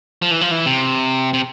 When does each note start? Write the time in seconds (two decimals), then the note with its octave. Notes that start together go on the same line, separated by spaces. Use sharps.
0.22 F3
0.31 E3
0.41 F3
0.51 E3
0.66 C3
1.34 C3